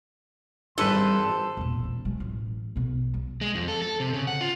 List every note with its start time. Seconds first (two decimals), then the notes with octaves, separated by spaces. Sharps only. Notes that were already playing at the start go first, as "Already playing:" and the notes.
0.78 G#1 E3 G3 D4 A4 B4 C5 C6
1.57 E1 A#2
1.80 E1 A#1
2.05 F#3 G#3
2.20 A1
2.76 B1 B2
3.14 F#3
3.41 G#3
3.55 F2
3.68 A4
3.82 A4
4.00 C3
4.13 C#3
4.27 F#5
4.41 F4